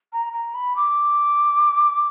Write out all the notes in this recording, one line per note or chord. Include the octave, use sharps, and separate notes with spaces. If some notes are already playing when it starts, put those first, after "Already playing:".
A#5
A#5
B5
D6